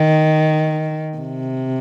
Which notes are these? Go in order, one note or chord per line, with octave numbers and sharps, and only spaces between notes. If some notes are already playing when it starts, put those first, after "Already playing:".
Already playing: D#3
C3